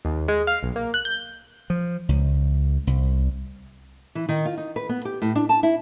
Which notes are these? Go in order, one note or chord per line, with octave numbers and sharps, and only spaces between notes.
D#2
G#3
F5
B1
A#3
F#6
G6
F3
C#2
C2
E3
D#3
F4
D#4
B4
B3
G4
A2
D4
A5
E4